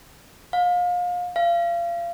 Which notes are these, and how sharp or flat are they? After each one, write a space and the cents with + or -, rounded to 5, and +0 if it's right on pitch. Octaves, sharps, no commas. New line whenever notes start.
F5 +30
F5 -30